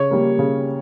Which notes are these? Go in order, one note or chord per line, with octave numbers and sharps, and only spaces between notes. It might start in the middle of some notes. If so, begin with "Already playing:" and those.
Already playing: C#3 C#5
G3 A#3
C#3